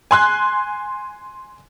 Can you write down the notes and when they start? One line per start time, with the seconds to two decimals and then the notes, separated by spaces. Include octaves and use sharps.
0.11 G#5 C6 F#6